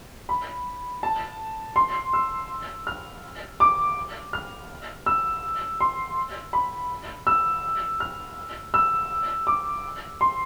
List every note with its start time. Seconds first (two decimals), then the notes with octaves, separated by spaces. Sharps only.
0.29 B5
1.03 A5
1.76 C6
2.13 E6
2.87 F6
3.60 D6
4.33 F6
5.06 E6
5.81 C6
6.53 B5
7.27 E6
8.00 F6
8.74 E6
9.47 D6
10.21 C6